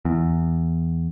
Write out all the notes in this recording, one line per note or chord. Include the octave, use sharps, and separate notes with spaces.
E2